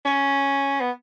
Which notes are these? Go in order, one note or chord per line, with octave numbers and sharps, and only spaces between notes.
C#4
B3